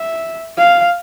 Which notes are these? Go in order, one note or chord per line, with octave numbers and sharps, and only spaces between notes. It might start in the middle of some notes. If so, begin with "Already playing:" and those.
Already playing: E5
F5